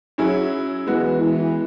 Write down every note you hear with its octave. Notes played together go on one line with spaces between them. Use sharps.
F#3 C#4 E4 G#4
E3 G#3 B3 F#4
E3